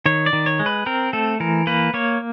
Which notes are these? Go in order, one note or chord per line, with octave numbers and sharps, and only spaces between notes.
D#3 C#5
D5
D#3
C#5
G#3
B4
C4 A#4
A3 A4
E3 A#4
A#3 B4
A#3 C#5